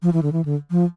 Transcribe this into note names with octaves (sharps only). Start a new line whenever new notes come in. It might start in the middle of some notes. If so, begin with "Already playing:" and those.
F3
E3
D3
E3
D3
F3